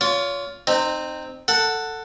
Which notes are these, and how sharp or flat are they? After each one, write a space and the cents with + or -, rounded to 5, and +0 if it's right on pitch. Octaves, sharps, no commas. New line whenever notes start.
F4 +5 C#5 +35
C4 +0 D#4 -25
A4 +15 F#5 +0